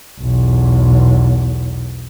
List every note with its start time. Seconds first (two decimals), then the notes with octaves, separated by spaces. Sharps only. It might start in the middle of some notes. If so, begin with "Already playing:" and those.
0.21 B1 E2